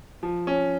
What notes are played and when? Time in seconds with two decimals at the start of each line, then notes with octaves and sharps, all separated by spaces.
0.23 F3
0.47 C#4